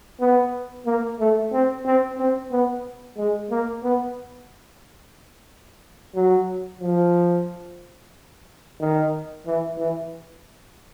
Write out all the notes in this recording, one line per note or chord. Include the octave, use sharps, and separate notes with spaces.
B3
A#3
A3
C4
C4
C4
B3
G#3
A#3
B3
F#3
F3
D#3
E3
E3